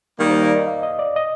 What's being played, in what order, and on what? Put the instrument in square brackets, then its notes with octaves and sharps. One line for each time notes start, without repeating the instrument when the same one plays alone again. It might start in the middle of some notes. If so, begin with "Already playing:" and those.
[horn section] D#3 G3 A#3
[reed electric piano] C5
D5
D#5
F5
D#5
D5
D#5